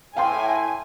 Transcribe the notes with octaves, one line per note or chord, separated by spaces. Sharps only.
A2 F5 G5 G#5 C6